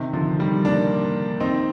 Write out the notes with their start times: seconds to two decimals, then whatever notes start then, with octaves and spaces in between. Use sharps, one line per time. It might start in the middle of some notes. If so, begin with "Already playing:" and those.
Already playing: C3 D#3
0.13 D3 F3
0.39 D#3 G3
0.65 A#3 D4
1.40 C4 D#4